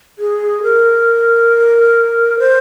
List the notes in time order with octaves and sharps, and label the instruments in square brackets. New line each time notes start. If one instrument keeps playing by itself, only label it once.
[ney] G#4
A#4
C5